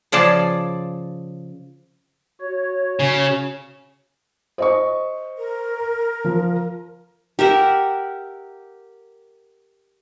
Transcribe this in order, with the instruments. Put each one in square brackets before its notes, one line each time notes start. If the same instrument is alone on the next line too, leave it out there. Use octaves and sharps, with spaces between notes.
[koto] C#3 F3 G#4 D5 A5
[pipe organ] F#4 C#5
[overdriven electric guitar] C#3
[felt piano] C5 D#5 C#6
[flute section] A#4
[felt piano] F3
[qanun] G4 A#4 E5 F#5